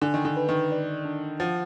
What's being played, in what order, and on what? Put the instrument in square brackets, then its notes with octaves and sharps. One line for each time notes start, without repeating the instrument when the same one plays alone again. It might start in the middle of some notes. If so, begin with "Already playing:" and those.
[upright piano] D3 [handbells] G#5
[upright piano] D#3
D3
[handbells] B4
[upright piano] D#3
[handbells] D5
D4
[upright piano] F3 [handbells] F#5